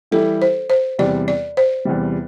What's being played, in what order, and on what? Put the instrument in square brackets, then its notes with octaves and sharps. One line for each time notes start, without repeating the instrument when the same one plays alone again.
[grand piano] E3 G3 E4 G4 [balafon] A4
[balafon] C5
C5
[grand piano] E2 C3 G3 [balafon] D5
[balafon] D5
C5
[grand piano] E2 C3 G3